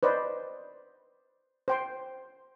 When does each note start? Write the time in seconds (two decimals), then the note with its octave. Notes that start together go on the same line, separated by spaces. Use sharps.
0.03 B4 C5 D5 D#5
1.68 C5 G5 C6